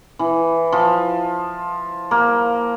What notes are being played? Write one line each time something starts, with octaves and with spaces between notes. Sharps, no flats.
E3
F3
A#3